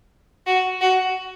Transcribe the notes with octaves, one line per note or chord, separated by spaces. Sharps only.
F#4
F#4